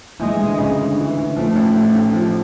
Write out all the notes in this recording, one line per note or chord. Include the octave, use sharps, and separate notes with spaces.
E3 G#3
D2
C#3
D2
E3
D2
F3 A3
A1
A2
A1
F3